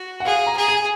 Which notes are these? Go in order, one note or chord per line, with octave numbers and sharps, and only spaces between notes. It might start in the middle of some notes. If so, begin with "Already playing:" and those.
Already playing: F#4
F#5
G#4 F5
A#5
G#4
G#5